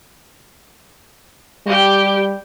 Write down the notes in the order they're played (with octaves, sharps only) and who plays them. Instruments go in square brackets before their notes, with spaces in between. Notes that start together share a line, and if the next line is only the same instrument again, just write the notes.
[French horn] G3 [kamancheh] G4 G5